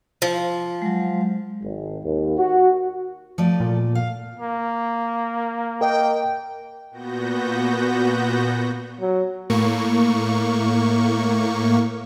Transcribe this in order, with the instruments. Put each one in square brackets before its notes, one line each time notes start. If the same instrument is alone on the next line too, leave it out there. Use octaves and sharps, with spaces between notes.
[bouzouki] F3
[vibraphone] F#3 G#3
[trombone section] G#1
D#2
F#4
[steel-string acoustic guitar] F3 A3 D5
[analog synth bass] A#2
[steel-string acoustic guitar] F5
[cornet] A#3
[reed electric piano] A#4 D#5 [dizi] G5
[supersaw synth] A#2 B3 F#4 G6 A#6
[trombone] F#3
[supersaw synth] A2 A#3 C#6